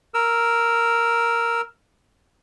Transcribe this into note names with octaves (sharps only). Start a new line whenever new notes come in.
A#4 E6